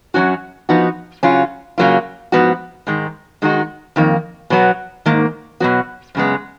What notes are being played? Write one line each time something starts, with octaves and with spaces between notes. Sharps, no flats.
F#2 D#3 F#3 C#4 F#4
F3 B3 D#4 F#4
C#3 F#3 C#4 F4
C#3 F#3 A#3 F4
G#2 F3 B3 F#4
G#2 D#3 G#3
D#3 G#3 D#4 F#4
F2 D#3 A#3
B2 F#3 B3
G#2 D#3 A#3
B2 F#3 B3 F#4
F#2 C#3 G#3 B3